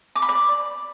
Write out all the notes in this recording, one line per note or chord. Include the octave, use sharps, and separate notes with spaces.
D6
B5
D5